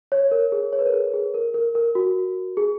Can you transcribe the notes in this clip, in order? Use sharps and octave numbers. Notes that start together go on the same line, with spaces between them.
C#5
A#4
G#4
C#5
B4
A#4
G#4
G#4
A#4
A#4
A#4
F#4
G#4